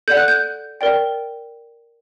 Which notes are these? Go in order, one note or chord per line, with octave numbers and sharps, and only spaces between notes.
A4 D5 F#5 G6
F#6
G6
A#4 D5 G5